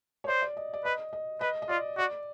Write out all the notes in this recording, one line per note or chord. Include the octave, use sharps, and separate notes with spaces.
C#5
C5 D5
D5
D#5
D5
B4 D#5
D#5
B4 D#5
D#5
F4 D5
F#4 D5